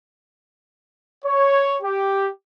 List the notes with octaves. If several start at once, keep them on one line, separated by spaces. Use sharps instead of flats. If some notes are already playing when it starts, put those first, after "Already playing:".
C#5
G4